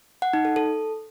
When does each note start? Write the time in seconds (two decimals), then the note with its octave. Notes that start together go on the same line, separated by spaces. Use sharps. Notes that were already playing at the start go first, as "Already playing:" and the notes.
0.22 F#5
0.33 D#4
0.45 A4
0.56 A4